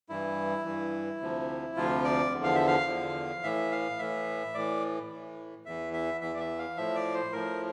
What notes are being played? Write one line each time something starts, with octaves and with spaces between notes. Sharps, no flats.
G2 E3 E4
G2 E3
D2 C3 F3
D2 C3 F3 F4
D5
E2 D3 F3
F5
E5
F5
E2 D3 F3
A2 E3 E5
F5
A2 E3 E5
A2 E3 D5
A2 E3
E2 E3 E5
E5
E2 E3 E5
D5
E5
F5
A2 F3 E5
D5
C5
A2 F3 A#4